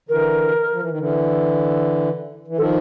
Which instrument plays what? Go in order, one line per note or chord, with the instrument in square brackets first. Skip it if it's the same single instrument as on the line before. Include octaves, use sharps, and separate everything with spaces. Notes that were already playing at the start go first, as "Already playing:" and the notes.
[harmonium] D3 E3 [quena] A#4
[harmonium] F3
E3
D#3
D3 E3
E3
[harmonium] D#3 F3 [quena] A4